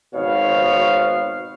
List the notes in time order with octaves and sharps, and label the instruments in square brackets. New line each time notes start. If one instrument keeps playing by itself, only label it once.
[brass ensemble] G#1 B2 C5 C#5 F5